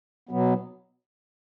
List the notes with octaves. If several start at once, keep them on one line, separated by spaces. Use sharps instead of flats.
B2 F#3 B3